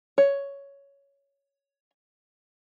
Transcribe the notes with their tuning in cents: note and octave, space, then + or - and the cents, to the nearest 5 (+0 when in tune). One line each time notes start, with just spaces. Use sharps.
C#5 +10